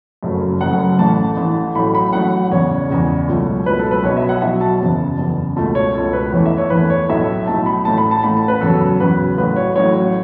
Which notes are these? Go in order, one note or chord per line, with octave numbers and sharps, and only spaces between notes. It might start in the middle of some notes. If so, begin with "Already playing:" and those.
F#1 F#2 C#3 F#3 A3
F#1 F#2 C#3 F#3 A3 F#5
A1 A2 E3 A3 A5
A1 A2 E3 A3
A1 A2 F#3 A3 B5
B5
A1 A2 F#3 A3 F#5
E1 E2 C#3 C#5
E1 E2 C#3
C#2 B2 F#3 A3
C#2 B2 F#3 A3 B4
A4
B4
B1 B2 F#3 C#5
E5
F#5
B1 B2 F#3 E5
A5
F#1 E2 C#3
F#1 E2 C#3
C#2 B2 A3 A5
C#5
C#2 B2 A3 A4
B4
E2 E3 A3 C#5
E5
C#5
E2 E3 A3 B4
C#5
B1 A2 A3 E5
B1 A2 A3 A5
B5
A1 A2 A3 A5
B5
A5
A1 A2 A3 B5
A5
B4
E2 C#3 F#3 A4
E2 C#3 F#3 B4
A1 A2 F#3 B4
C#5
A1 A2 F#3 C#5